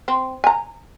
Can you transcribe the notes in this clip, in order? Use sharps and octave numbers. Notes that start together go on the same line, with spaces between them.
C4
G#5 A#5